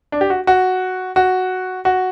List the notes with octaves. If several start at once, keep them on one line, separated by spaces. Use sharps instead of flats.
D4
G4
F#4
F#4
F#4
F#4